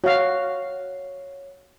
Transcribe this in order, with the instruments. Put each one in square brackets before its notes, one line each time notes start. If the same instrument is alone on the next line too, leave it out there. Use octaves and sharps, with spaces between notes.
[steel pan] F#4 F5 [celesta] C#5